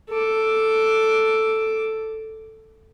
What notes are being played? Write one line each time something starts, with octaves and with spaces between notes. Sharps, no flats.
A4 D6